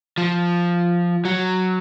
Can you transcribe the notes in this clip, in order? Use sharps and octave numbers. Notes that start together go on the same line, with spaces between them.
F3
F#3